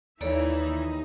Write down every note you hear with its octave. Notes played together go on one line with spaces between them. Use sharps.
D#2 E3 D#4 A4 C#5 D5 E5 B5